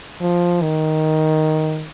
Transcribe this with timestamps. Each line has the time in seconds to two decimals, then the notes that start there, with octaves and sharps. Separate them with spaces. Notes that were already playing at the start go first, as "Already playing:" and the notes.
0.21 F3
0.62 D#3